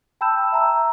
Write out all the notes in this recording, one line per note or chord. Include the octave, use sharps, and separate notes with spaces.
G5 A5 B5 E6 G6 E7
E5 A#5 E6